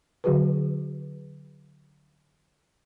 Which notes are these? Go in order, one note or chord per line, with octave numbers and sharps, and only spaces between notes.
D3 F#3 F#4 G#4 B4